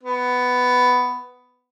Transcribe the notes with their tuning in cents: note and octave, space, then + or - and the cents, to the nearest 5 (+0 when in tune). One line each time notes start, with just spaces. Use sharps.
B3 +10